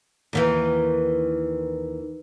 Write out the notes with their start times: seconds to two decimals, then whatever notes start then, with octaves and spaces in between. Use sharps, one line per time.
0.33 D#2 D#3 E3